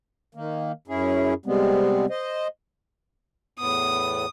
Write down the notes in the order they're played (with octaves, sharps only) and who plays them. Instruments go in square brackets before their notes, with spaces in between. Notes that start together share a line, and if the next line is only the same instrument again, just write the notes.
[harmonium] D#3 A#3
F#2 C#4 E4 G#4
C3 G3 G#3 B3 C4
C5 D#5
[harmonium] E2 A2 B3 [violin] D#6